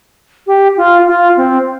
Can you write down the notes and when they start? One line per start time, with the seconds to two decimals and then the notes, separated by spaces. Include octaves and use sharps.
0.47 G4
0.77 F4
1.07 F4
1.37 C4